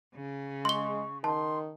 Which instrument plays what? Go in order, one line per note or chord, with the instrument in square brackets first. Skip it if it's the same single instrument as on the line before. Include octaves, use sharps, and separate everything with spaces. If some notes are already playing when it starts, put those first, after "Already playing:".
[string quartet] C#3
[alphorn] G#3 [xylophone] C6 G7 [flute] C#6
[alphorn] D#3 [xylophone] A5 [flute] C6